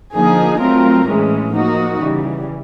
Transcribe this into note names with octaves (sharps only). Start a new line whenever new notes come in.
D3 F3 A#3 D#4 G#4
F#3 A3 C4 F4 A#4
A2 E3 G#3 C#4
F3 A#3 D#4 F#4
C#3 E3 G3